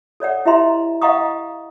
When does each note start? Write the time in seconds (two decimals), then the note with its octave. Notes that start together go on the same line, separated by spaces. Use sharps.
0.20 A4 C#5 D5 F#5
0.45 E4 G4 D#5 E5 A#5 C6
1.02 D#5 F5 F#5 A#5 C#6 D#6